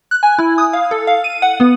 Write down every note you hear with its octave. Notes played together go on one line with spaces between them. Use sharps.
F#6
G#5
E4
D#6
F5
A4
F5
D#7
F#5
B3